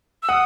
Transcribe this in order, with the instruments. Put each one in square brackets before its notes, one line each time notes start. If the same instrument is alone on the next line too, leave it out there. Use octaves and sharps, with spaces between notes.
[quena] E6
[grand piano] F#5 [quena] D#6